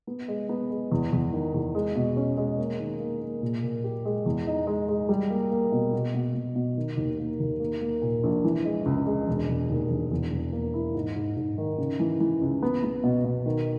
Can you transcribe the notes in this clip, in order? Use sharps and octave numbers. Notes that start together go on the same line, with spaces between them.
B3
G#3
B3
G#3
E2
E2
D#3
E2
G#3
B2
C#4
G#3
A#3
D#3
A#3
A#3
A#2
A#2
G4
G#3
E2
D#4
G#3
G#3
G3
A#3
A#3
B2
B2
B2
B2
B2
D#3
D#2
A#3
D#2
A#3
A#3
A#2
A#1
E3
G#3
C#2
G#3
E1
E1
D#2
E1
E2
E2
A#3
E4
G#2
G#2
G#2
D#3
C#3
E3
E3
C#2
B3
B3
B2
B2
D#3